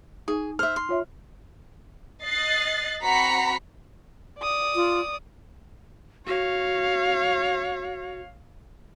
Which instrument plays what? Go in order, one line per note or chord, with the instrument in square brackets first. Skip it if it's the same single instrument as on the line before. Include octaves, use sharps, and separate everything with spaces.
[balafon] D#4 [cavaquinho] G#4
[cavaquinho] C5 E5 [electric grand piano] F6
[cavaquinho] C6
[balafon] F4 C#5 E5
[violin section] D#5 F#6 A6 C7
C4 F#4 A#5 B5 B6 C#7
[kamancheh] D5 D#6
[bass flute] F4
[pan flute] F#4 [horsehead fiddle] C#5 F5